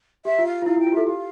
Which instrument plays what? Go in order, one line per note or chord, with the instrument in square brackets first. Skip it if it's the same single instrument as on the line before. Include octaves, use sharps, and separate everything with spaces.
[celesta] G4 [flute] E5
[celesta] F4
[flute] F5
[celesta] F4
[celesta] E4 [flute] F5
[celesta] E4
[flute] G5
[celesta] F4
[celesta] G4 A4 [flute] E5
[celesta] G4 [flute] F5